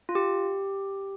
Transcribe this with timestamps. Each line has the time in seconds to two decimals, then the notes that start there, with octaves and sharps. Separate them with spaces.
0.09 F4
0.15 G4